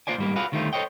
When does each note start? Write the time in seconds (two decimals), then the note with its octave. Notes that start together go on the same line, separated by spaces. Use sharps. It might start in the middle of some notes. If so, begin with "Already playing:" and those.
0.07 A#3 F4 C5 D5 G#5
0.18 G#2 G3 A#3
0.36 F4 F#4 G#4 B4 D5 F5
0.52 D2 D#3 G3 A3 F4 C5
0.73 A4 C5 C#5 D#5 G5